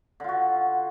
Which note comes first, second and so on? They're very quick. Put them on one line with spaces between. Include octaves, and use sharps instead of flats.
D3 F4 F#4